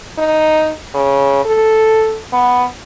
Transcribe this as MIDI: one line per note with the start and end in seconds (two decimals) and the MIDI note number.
0.18 0.71 63
0.94 1.41 49
1.45 2.18 69
2.33 2.64 59